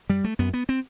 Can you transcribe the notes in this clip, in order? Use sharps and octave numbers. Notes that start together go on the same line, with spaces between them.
F#2 G3
A3
F#2 B3
B3
C4